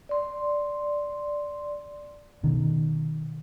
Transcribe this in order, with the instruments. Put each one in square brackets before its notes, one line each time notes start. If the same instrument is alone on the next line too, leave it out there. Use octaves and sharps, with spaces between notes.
[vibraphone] D5 C6
[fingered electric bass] B2 D#3